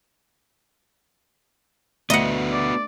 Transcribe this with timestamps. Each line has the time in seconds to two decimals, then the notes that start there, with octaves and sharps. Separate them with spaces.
2.10 D2 B3 D4 F#4 D#5 F#5
2.53 D5